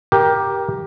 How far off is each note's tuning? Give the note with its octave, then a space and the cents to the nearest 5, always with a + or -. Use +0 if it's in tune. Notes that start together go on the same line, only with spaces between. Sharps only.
G4 +0 A#4 +15